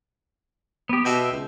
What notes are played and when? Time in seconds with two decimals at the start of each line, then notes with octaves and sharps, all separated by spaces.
0.89 B3 G4
1.05 B2 E5 G5
1.31 C#2